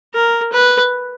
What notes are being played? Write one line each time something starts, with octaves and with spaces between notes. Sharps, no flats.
A#4
B4